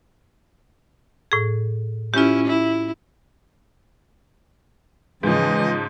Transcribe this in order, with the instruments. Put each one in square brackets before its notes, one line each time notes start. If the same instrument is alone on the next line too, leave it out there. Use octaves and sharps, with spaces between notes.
[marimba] A2 G#4
[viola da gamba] C#4 E4 [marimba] F4 G4
[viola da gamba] E4
[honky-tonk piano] G#2 F3 [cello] C#3 D#5 [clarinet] E3